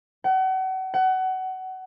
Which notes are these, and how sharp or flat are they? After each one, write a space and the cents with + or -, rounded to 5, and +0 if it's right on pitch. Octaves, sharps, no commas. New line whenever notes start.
F#5 +35
F#5 +25